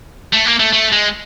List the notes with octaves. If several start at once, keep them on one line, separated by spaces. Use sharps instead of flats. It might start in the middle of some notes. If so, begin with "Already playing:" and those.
A3
A#3
A3
A3
G#3